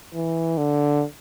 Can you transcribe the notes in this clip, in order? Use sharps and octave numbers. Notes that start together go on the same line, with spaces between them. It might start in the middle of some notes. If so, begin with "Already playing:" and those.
E3
D3